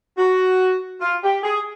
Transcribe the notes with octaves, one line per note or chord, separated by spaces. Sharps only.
F#4
F4
G4
G#4